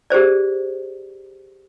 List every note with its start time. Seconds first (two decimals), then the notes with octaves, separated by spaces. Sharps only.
0.10 G4 G#4 C5 D5